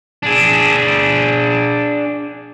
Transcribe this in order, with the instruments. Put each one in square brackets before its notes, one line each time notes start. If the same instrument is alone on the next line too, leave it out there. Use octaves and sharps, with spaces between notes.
[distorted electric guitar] D4 G#4